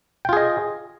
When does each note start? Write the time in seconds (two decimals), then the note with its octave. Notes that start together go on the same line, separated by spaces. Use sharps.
0.25 G5
0.29 F4
0.33 G#4
0.37 D#5